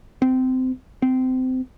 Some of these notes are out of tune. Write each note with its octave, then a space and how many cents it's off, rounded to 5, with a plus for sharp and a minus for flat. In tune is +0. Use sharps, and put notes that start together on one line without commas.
C4 -25
C4 -25